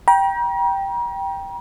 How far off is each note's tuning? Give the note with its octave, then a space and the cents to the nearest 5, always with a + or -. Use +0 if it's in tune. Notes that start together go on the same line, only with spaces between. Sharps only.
G5 +0 A#5 +40